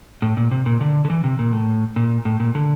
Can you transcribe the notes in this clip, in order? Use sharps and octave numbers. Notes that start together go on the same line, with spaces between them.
A2
A#2
C3
A#2
D3
D3
E3
C3
A#2
A2
A#2
A2
A#2
D3